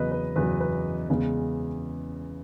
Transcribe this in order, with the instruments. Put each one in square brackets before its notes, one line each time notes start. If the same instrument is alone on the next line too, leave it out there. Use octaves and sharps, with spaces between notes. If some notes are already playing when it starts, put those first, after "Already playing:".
Already playing: [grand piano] E2 C#3 F#3 B3 B4 D#5
B4
E2 C#3 F#3 B3 B4
B4
E2 C#3 G#3 B3